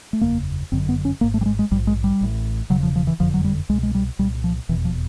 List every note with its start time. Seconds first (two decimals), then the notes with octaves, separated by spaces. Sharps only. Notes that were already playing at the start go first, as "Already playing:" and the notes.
0.13 A3
0.21 F#1 E2 C#3 A#3
0.72 G1 F#2 D3 C4
0.89 B3
1.05 C#4
1.21 G#1 G#2 A#3
1.34 A3
1.41 G3
1.46 G#3
1.59 G#3
1.71 A#1 G#2 G3
1.87 G#3
2.04 G3
2.21 A1 A2
2.70 E1 D#2 C#3 F#3
2.83 F3
2.96 F3
3.07 E3
3.19 F#1 F2 D3 F3
3.34 F#3
3.44 G3
3.69 C2 G#3
3.73 B2
3.83 G#3
3.95 G3
4.19 C2 A#2 G3
4.44 F3
4.69 F1 E2 B2 E3
4.85 F3